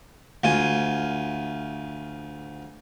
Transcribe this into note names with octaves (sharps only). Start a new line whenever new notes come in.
D2 F4 G#5